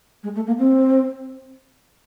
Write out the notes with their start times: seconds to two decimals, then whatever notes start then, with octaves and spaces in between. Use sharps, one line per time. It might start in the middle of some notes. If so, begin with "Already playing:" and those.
0.23 G#3
0.35 A3
0.47 A#3
0.59 C4